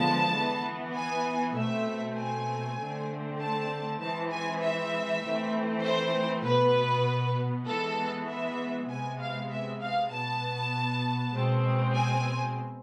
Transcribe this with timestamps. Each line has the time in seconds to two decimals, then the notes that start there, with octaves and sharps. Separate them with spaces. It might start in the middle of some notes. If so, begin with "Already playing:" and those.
Already playing: D3 F3 G#3 B3 A5
0.34 E3 B3
0.95 G#5
1.55 B2 A3 C4 E5
2.17 G#5
2.79 D3 A3 C4
3.39 A5
4.00 E3 G#3 C4 A5
4.31 G#5
4.62 E5
5.22 E3 A3 C4
5.83 C5
6.44 B2 B3 B4
7.66 E3 G#3 B3 A4
8.28 E5
8.88 C3 G#3 B3 G#5
9.19 F5
9.50 E5
9.80 F5
10.10 B2 B3 A5
11.33 B2 G#3 C4
11.93 G#5